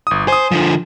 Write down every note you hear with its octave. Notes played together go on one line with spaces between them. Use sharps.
G1 D#6
C5 G#5 D#6
D3 F3